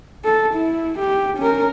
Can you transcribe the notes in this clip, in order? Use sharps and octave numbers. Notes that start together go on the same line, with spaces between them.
A4
E4
G4
C#4 A#4